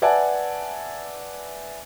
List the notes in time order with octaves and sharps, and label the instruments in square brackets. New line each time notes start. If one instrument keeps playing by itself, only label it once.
[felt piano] B4 D5 E5 F#5 G#5 A5